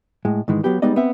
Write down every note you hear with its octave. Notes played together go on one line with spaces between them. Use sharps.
A2 G#3
G#2 D#3 E3 G#3
F#3 B3 G4
G3 G#3 B3 D#4 D5 D#5
B3 C4 E5